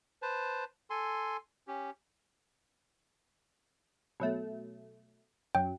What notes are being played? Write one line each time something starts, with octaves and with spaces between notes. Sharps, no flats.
B4 C5 A5
A4 G#5 C6
C#4 G4
B2 F#3 A3
F#2 F#3 G5